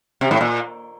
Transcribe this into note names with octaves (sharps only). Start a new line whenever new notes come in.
C3
A2
A#2